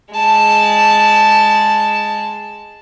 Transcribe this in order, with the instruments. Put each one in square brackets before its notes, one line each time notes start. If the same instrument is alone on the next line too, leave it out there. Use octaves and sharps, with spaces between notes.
[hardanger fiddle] G#3 A5